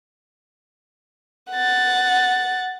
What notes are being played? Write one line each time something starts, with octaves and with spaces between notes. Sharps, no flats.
F#5 A6